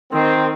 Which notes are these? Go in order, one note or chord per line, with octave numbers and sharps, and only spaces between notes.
D#3 C4